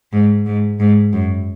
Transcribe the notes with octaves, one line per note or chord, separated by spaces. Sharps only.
G#2
G#2
G#2
F#2